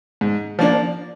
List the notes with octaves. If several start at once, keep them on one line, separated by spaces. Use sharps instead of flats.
G#2
F3 A#3 D4